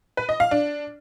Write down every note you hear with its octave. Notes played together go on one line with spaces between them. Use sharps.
B4
D#5
F5
D4